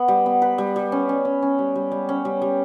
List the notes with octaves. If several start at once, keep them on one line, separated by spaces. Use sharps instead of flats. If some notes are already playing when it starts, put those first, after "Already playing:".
Already playing: B3 B4
G3
B3
B4
G3
G3
C#4
C#4
C#4
C#4
G3
G3
G3
C#4
G3
G3